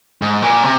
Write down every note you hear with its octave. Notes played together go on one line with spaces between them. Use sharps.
G#2
A#2
C3